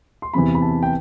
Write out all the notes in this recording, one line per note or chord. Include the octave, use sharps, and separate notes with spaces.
C6
E2 C3 E3 B5
B5
A5
G5